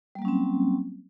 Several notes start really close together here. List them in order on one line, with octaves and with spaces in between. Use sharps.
G3 A#3 F#3 C#4 C4